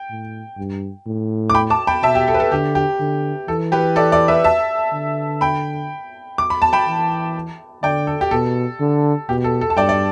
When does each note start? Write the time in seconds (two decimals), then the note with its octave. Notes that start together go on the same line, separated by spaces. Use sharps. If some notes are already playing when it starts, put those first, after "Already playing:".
Already playing: G5
0.10 A2
0.57 G2
1.06 A2
1.50 D6
1.55 G5 B5
1.70 A5 D6
1.87 G5 B5
2.02 B2 E5 A5
2.15 G4
2.28 A4
2.34 B4
2.40 A4
2.52 D3 G4
2.75 G4
3.00 D3
3.48 E3 A4
3.72 G4 B4
3.96 A4 D5
4.12 A4 D5
4.28 B4 E5
4.44 E5 A5
4.93 D3
5.41 G5 B5
6.38 D6
6.50 B5
6.62 A5
6.73 G5 B5
6.87 E3
7.83 D3 D5 G5
8.07 A4
8.21 G4
8.31 B2 A4
8.80 D3
9.29 B2 G4
9.44 A4
9.61 A4
9.70 A5
9.77 G2 D5 G5
9.89 D5